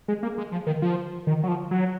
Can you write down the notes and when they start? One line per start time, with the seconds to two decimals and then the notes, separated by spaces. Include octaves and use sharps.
0.08 G#3
0.23 A#3
0.38 G#3
0.52 F3
0.67 D#3
0.82 F3
1.27 D#3
1.43 F#3
1.48 F3
1.71 F#3